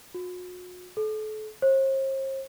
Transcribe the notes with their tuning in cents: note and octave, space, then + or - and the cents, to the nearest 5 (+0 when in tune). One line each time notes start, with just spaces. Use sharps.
F#4 -40
A4 -35
C5 +45